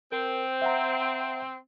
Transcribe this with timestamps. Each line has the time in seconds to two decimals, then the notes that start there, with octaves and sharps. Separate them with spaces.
0.12 C4 A#4
0.62 E5 F#5 A#5